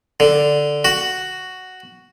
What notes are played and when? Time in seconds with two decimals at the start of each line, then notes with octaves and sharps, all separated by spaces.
0.20 D3
0.85 F#4